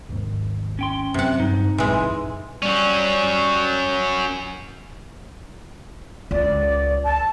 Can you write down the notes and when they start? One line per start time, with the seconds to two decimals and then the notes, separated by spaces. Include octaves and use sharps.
0.09 G#1 D#2 G#2
0.79 C#4 G5 C6
1.14 F#1 C3 F#3 F#5
1.40 G2 D#4
1.78 A#1 F#2 A2 E3 G#3 C6
2.62 F#3 G3 C#4
6.31 C#2 D5
7.03 A5